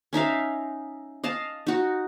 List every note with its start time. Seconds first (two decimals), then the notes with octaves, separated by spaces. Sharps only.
0.13 C#4 D#4 E5 F5
1.24 D#5 F5 A5
1.67 D#4 F#4